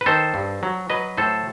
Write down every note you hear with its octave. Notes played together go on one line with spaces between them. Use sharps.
B4
D#3 A4 C5
G2
F#3
F#3 B4 D#5
A2 A4 C5